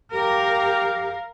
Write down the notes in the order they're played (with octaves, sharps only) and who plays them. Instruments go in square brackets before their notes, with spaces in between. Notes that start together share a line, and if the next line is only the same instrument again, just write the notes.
[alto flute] G4 [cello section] A#4 [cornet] F5 [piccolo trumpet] F6